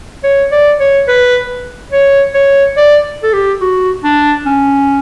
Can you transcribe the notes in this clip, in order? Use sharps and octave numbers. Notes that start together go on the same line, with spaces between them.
C#5
D5
C#5
B4
C#5
C#5
D5
A4
G4
F#4
D4
C#4